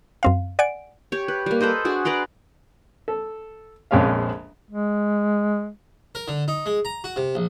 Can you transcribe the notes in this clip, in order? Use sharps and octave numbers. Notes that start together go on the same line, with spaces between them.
F#2 C4 F5
D5 F#5 G#5 D7
G4 C#5
B4
G3 A#3
A4 B4 C5 D#5
D4 F#4 G#4
B4 D5 A#5 C6
A4
A#1 F2 G#3 C#4 F5
G#3
A#4
D3
D#4
G#3
A#5
F#4
C3
A#1